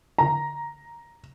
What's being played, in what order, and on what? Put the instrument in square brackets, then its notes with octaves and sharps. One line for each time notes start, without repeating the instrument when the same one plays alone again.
[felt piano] A#5